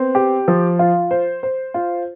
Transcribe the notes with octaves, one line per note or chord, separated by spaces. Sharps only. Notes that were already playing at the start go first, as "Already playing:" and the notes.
Already playing: B3 C4
G4
F3
F4
C5
C5
F4